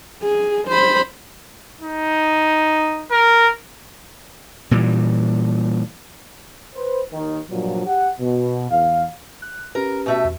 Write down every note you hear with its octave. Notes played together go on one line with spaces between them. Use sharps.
G#4
C5 B5
D#4
A#4
A#2 E3 G3
B4 C5
D#2 D#3
G2 A#2 F3 F#3
G4 F#5
B2
E2 F5
F#6
C#4 G4 A#4 B4
B2 A3 E5
E2